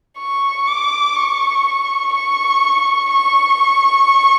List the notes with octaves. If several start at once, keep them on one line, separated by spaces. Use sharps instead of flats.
C#6
D6
C#6
C#6
C#6